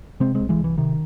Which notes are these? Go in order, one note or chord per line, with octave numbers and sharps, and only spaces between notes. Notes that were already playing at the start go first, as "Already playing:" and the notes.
C3 G#3 C4
C2 G#3 C4
E3 G#3
C2
E3
C3 D#3